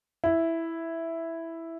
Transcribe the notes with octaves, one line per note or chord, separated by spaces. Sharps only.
E4